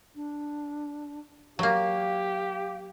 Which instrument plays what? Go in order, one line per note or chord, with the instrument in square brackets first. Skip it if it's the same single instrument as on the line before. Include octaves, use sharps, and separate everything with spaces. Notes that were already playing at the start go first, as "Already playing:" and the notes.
[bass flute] D4
[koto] F#3 A#3 [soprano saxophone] G4 [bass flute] F5